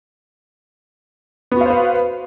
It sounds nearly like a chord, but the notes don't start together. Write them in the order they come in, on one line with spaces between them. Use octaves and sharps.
B3 F#4 F5 C5 B4